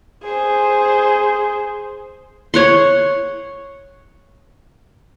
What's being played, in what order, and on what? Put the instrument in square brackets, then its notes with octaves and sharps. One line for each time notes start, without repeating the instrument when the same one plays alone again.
[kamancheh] G#4 C5
[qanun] C#5 F#5 C6